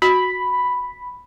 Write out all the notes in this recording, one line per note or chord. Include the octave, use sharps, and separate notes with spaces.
F#4 B5